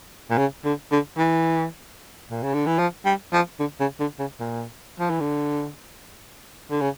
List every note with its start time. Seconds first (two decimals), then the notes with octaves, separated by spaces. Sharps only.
0.30 A#2
0.37 C#3
0.65 D3
0.91 D3
1.18 E3
2.31 A#2
2.43 C#3
2.54 D3
2.66 E3
2.79 F3
3.05 G3
3.33 F3
3.59 D3
3.80 C#3
4.00 D3
4.19 C#3
4.40 A#2
5.00 F3
5.10 E3
5.21 D3
6.71 D3
6.81 C#3